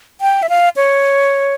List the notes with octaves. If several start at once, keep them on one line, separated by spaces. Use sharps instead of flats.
G5
E5
F5
C#5